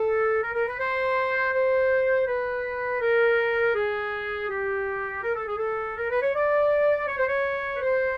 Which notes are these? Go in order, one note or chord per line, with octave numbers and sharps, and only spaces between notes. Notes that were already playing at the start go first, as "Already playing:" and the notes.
Already playing: A4
A#4
A#4
B4
C5
C5
B4
A#4
G#4
G4
A#4
A4
G#4
A4
A#4
B4
C#5
D5
C#5
C5
C#5
B4
C5